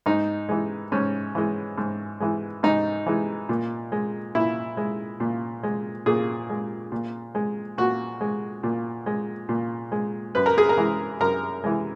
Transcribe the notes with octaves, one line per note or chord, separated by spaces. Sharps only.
G#2 D#4
E3 G#3
G#2 C#4
E3 G#3
G#2
E3 G#3
G#2 D#4
E3 G#3
A#2
G#3
A#2 E4
G#3
A#2
G#3
A#2 G#4
G#3
A#2
G#3
A#2 F#4
G#3
A#2
G#3
A#2
G#3
F#2 B4
A#4
G#4
A#4
E3 G#3
F#2 A#4
E3 G#3